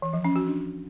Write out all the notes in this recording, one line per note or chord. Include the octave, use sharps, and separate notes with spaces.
E3
F3
C#4
F#4
D4